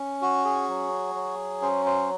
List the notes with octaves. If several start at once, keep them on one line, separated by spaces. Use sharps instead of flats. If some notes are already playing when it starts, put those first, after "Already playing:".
Already playing: C#4
F#4
G#4
F#3
F#3
C#4 C5
C5